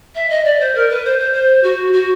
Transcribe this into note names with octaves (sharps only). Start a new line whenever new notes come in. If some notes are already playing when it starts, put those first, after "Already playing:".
E5
D#5
D5
C5
A#4
B4
C5
C5
C5
F#4
F#4